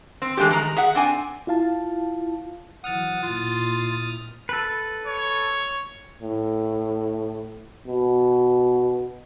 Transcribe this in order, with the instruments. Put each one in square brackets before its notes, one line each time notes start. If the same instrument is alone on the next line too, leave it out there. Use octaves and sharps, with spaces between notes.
[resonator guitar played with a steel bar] C4
E3 G#3 A3 D4 G4
D#3 G#3 A#5
G#4 E5 F#5
C4 D4 G#5
[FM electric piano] E4 F4 F5 A5
[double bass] E3 F#3 [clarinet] F#5 [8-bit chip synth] D#6 F6 A6
[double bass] A#2 E4 [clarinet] F4
[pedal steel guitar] A4 B4
[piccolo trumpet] C#5
[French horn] A2
[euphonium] B2